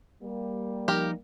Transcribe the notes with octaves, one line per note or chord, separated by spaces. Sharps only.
G3 A#3
F3 D#4 G4 A#4